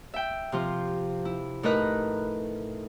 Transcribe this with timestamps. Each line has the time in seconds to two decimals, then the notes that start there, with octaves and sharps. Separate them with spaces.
0.14 E5 G5
0.52 C3 F3 F4
1.25 E4
1.63 A2 D#4 A#4 B4 D#5 F#6